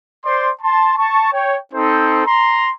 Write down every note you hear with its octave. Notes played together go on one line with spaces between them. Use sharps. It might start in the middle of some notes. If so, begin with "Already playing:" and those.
C5 D5 C6
A5 C6
A5 C#6
C#5 G5
C4 D#4 A4 C5
A#5 C6